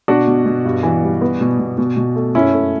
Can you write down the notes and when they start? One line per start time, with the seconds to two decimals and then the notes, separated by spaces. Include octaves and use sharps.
0.08 B2 D4 F#4
0.27 B2
0.46 B2
0.65 G2
0.83 E3
1.02 G3
1.21 B3
1.41 B2
1.59 B2
1.78 B2
1.97 B2
2.16 A3
2.35 F#2 C#4 E4
2.53 A3